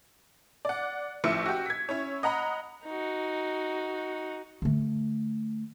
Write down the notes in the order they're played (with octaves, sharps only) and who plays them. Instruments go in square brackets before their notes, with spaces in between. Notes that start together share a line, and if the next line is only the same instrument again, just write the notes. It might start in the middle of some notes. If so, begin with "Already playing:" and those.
[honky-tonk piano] D5 F#5
A1 F3 A3 E4 E6 C#7
F#4 G4
G#6 B6
C#4 E4 C#5
D#5 F#5 A#5 B5
[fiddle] D#4 F#4
[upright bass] D3 A3